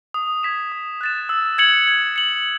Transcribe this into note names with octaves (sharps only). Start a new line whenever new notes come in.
D#6
G#6 B6 E7
D#6
F#6 A6 E7
E6
G#6 C#7 F#7
G#6
C#7 F#7